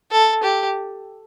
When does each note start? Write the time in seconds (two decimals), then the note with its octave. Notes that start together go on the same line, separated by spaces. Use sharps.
0.11 A4
0.43 G4